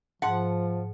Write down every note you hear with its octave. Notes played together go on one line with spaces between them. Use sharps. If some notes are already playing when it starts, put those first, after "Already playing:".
G#2 F3 F#5 A5